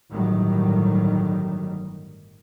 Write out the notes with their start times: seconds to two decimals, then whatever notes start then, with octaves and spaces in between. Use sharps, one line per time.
0.12 G1 A2 D#3 F#3 G3